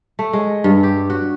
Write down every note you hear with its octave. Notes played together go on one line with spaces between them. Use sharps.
A3
G#3
G2
G4
F#4